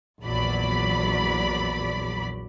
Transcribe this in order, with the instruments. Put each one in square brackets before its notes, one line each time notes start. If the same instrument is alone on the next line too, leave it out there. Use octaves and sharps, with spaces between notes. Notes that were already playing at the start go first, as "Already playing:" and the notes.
[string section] A#1 E2 F#3 D5 B5